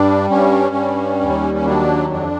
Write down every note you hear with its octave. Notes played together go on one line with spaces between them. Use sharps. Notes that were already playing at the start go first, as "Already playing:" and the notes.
Already playing: G2 G3 D4
G2 C#4
G3
D#2
C#4
F#3 D4
F2 D4